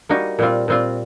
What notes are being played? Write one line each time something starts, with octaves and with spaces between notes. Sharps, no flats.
G3 A#3 D#4 F#4
A#2 G3 C4 F4
A#2 G3 C4 F4